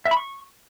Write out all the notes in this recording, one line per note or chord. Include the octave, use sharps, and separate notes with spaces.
E5
B5
C#6